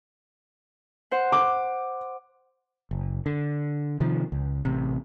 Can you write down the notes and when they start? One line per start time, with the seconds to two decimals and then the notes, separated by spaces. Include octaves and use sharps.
1.11 C5 F#5
1.32 D6
2.91 F#1
3.26 D3
4.00 C3 D#3 F3
4.32 C#2
4.65 A1 C3